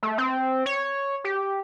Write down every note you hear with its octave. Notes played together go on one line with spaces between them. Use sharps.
A3
C4
C#5
G4